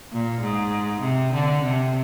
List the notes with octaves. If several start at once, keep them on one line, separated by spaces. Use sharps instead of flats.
A#2
G#2
C3
D3
C3